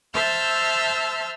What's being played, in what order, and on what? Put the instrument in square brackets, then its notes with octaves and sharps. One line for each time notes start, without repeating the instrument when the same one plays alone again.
[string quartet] C5 E5 A5 E6 F6 G6